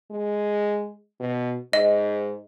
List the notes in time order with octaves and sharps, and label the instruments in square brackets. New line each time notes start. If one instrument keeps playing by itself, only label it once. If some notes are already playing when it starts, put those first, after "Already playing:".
[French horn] G#3
B2
[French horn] G#2 [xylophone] D#5